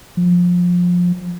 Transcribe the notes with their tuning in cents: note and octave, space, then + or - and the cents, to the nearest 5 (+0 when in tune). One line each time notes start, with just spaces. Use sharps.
F3 +20